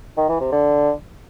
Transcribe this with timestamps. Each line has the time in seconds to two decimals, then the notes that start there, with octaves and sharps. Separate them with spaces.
0.17 D#3
0.29 E3
0.40 C3
0.52 D3